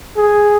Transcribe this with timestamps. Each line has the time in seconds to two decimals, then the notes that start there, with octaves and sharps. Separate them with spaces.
0.17 G#4